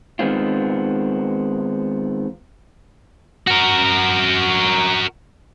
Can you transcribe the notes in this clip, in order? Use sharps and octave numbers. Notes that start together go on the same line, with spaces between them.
D#3 G#3 B3 C4 F4
F#4 A#4